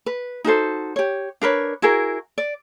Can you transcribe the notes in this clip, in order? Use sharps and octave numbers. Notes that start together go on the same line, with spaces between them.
B4
D#4 F#4 A4 C5
G4 C#5
D4 A#4 B4 C#5
E4 F#4 G#4 A#4
D5